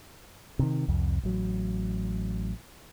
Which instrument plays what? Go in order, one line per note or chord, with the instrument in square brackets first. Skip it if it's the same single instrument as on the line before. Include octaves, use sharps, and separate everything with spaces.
[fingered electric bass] C3 D#3
C2 F2
A1 F#3